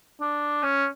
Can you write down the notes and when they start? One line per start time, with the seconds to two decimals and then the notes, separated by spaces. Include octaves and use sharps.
0.21 D4
0.63 C#4